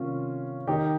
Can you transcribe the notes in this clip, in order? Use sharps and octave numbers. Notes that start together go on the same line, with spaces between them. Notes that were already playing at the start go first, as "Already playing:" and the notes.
Already playing: C3 D#3 G3 A#3 C#4 F4
D#3 A#3 D#4 G4